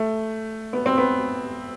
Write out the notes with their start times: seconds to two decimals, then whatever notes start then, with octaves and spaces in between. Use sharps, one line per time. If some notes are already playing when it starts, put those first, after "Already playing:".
Already playing: A3
0.73 B3
0.86 C4
0.98 B3